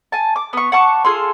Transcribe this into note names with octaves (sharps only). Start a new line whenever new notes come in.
G#5 A5
D6
B3 C#6
F#5 A5 C#6 D6
F4 G#4 A4 C6